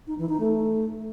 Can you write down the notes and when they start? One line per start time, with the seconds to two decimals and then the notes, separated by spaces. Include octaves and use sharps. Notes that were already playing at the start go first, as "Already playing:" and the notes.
0.07 D#4
0.18 E3
0.29 D#4
0.40 A3